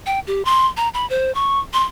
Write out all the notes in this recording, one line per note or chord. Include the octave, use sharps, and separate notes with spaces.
G5
G4
C6
A#5
B5
C5
C#6
C6